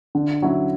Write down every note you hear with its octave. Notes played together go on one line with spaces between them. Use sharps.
D3
F#3 C#4 E4